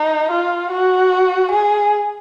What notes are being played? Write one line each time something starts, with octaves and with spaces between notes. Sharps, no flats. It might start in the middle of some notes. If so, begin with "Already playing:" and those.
Already playing: D#4
F4
F#4
G#4